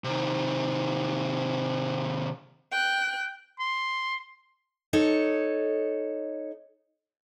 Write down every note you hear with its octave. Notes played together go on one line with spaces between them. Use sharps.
C3 D#3
G5 F#6
C6
D#4 A4 C#5